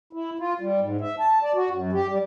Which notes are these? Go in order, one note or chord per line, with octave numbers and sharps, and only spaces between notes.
E4
F4
G3
G#2
E5
A5
D5
F#4
F#2
G4
G3